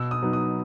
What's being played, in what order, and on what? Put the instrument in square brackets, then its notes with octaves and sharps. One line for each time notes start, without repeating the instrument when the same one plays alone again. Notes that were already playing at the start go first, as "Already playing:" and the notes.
Already playing: [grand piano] B2 E6
D#6
F#3 B3 D#4
D#6